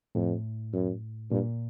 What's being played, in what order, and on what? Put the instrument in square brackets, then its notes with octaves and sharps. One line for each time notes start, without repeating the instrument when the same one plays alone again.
[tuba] F2 [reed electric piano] A2
[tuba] F#2
[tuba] G2 [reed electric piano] A#2